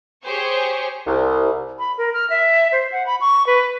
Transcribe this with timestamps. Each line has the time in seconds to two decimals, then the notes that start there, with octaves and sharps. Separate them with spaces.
0.24 G4 G#4 C5 C#5 C#6
1.06 C2
1.79 B5
1.98 A#4
2.14 F6
2.30 E5
2.72 C5
2.92 F#5
3.06 B5
3.21 C#6
3.47 B4